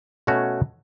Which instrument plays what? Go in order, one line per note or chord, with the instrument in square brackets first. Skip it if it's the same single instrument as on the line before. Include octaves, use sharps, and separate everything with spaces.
[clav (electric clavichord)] B2 A3 C#4 F#4 C#5